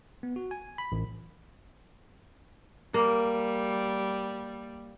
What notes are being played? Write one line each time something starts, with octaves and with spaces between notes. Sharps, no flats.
B3
F#4
G#5
B5
A1
G3 A#3